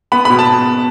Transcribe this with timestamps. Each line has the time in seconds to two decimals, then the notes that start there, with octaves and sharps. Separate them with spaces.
0.12 B3 B5
0.25 B2 B5
0.39 A5